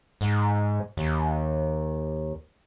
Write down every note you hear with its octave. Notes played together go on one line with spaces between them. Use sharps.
G#2
D#2